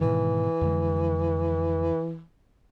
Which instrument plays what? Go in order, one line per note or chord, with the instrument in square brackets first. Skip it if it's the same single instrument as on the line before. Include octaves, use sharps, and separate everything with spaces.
[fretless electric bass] G#2 B2 D#3 [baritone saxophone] E3
[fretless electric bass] F2 D3 G#3